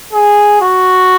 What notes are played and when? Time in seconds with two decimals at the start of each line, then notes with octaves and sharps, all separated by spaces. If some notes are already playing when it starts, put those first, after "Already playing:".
0.13 G#4
0.61 F#4